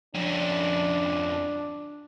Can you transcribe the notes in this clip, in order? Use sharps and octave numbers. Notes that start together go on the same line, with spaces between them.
F2 C#4 D4